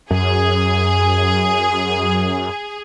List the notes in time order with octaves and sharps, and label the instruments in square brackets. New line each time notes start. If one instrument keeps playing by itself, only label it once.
[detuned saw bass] F#2 [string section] G#4